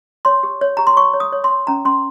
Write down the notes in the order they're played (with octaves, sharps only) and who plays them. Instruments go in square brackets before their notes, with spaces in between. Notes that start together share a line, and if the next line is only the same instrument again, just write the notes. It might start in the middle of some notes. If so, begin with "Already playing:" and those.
[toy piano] C#5 C6
G4
C#5
G4 A#5
C6
C#5 C#6
C#5
D#6
C#5
C6
C#5
C#4 A#5
C#4 C6